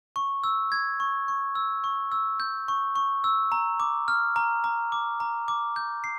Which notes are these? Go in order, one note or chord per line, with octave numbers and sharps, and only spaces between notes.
C#6
E6
G#6
C#6
C#6
E6
C#6
E6
G6
C#6
C#6
E6
A#5
D6
F6
A#5
A#5
D6
A#5
D6
G6
C7